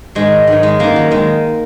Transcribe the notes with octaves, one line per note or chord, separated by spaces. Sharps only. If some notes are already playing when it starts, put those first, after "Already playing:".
G#2 D#3 G#3
G#2 D#3 F#3
G#3
F#2 D#3 A#3
F#3
D#3 G#3